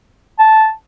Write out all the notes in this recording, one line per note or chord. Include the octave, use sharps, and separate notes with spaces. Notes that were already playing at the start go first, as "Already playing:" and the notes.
A5